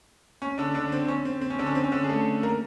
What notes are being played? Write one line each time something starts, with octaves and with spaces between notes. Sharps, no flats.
C#4
D3 D4
D3 D4
C4
C#4
C4
C4
C#4
D3 D4
C#4
C4
C#4
D3 D4
G#4
A3 A4
A#3 A#4